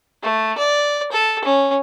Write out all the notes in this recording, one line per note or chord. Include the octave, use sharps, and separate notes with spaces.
A3
D5
A4
C#4